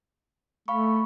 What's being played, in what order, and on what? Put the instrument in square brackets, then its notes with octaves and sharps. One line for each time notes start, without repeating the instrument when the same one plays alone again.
[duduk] A3 [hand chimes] F5 B5 C#6